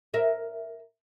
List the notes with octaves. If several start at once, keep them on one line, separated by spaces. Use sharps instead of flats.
A#4 E5